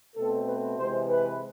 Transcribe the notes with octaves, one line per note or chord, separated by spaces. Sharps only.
B2 A3 C4 A4
B4
C3 E3 G#3 C5
B4